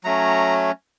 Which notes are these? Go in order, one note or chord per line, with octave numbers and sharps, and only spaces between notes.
F#3 A3 C#4 A#5